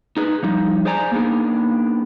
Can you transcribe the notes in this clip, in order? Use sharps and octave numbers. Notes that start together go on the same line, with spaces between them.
D#4 G#4 B4
F3 G3 D#4
G#4 C5 D5 G#5 A#5
A#3 B3 D4 D#4 G#4